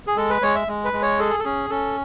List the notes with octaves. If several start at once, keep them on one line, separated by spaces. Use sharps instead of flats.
G#4
G#3 A4
B4
G#3 C#5
E5
G#3
B4
G#3
C#5
G#4 A4
A4
C#4 G#4
C#4 A4